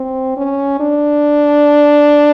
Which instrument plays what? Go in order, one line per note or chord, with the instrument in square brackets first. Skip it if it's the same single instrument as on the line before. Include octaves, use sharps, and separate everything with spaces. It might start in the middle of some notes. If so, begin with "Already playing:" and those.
Already playing: [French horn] C4
C#4
D4